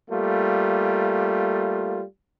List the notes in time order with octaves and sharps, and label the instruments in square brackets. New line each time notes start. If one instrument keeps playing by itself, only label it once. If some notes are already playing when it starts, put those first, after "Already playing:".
[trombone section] G3 A3 A#3 F4